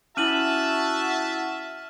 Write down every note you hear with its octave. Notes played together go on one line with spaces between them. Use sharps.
C#4 E4 F#4 E5 A5 F6 D#7 F#7